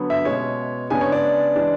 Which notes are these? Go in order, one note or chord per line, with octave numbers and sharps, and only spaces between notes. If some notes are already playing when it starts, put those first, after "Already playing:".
Already playing: D3 F#3 B3
E5
B2 G#3 C#4 C#5
C#3 G#3 B3 D4 G#5
C#5
D5
E3 G#3 D4